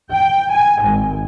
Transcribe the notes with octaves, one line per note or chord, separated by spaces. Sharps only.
G5
G#5
G#1